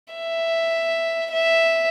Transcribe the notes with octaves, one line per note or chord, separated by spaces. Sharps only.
E5
E5